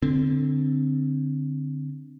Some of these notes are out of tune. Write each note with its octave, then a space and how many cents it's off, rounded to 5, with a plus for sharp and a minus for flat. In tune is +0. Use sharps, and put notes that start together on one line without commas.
D3 +0 C4 +0